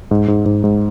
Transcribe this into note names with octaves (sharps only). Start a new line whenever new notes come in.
G#2
G#2
G#2
G#2